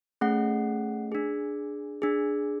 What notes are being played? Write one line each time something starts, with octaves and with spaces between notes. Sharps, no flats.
A3 C#4 G#4 F#5
D4 G#4
D4 G#4